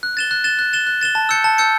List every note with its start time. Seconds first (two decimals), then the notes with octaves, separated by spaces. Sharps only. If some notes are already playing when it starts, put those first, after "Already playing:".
0.03 F#6
0.17 A6 E7 G7
0.31 F#6
0.44 A6 E7 G7
0.59 F#6
0.73 A6 E7 G7
0.87 F#6
1.01 A6 E7 G7
1.15 A5
1.29 E6 G6 C#7
1.44 A5
1.58 E6 G6 C#7